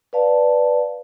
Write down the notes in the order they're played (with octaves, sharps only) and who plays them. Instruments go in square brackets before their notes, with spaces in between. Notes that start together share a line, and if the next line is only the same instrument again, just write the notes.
[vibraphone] B4 D5 F5 A5